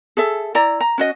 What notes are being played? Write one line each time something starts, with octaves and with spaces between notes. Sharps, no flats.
G#4 A4 E5
E4 D5 A#5
A#5
C#4 F#4 D#5